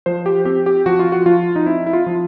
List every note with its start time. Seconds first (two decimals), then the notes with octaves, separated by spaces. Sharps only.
0.06 F3 C5
0.26 G4
0.45 C4 G4
0.66 G4
0.86 F3 F#4
0.99 F4
1.12 F#4
1.26 F3 F4
1.56 D#4
1.66 C4 E4
1.86 E4
1.93 F4
2.06 F3